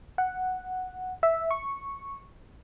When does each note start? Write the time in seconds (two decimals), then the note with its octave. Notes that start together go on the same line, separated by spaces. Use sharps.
0.18 F#5
1.23 E5
1.51 C#6